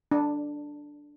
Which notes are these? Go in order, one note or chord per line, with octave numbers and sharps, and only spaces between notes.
D4